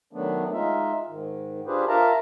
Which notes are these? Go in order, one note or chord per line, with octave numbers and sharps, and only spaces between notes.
D#3 F#3 A3 B3 D4
G#3 D#4 F4 E5
G#2 D#3
D4 F4 G4 G#4 B4 C5
F4 A#4 E5 F5 A5 A#5